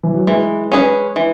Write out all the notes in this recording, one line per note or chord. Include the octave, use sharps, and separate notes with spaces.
E3
F#3
E3 G#3
C#4 G#4 B4
E3